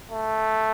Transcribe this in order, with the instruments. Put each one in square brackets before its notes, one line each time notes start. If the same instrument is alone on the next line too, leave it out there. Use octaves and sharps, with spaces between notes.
[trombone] A3